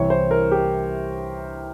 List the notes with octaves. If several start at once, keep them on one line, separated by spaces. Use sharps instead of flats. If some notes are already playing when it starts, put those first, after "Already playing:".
Already playing: C2 C3 E3 C#5
C5
A#4
G4